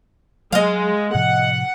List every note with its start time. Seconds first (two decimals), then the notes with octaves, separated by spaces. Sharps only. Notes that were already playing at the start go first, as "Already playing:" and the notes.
0.52 F#3 G#3 D#5 F5
1.15 A2 C3 F3 F#5